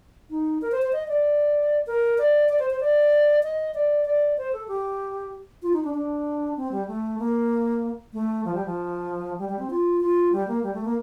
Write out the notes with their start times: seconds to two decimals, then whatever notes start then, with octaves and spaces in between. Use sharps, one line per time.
0.30 D#4
0.62 A#4
0.72 C5
0.82 C5
0.92 D#5
1.08 D5
1.87 A#4
2.18 D5
2.49 D5
2.59 C5
2.70 C5
2.80 D5
3.43 D#5
3.74 D5
4.05 D5
4.38 C5
4.53 A4
4.68 G4
5.63 F4
5.73 D#4
5.84 D4
5.94 D4
6.57 C4
6.72 G3
6.88 A3
7.19 A#3
8.13 A3
8.45 F3
8.55 G3
8.65 F3
9.38 G3
9.49 G3
9.59 C4
9.70 F4
10.01 F4
10.33 G3
10.48 A#3
10.63 G3
10.74 A3
10.85 A#3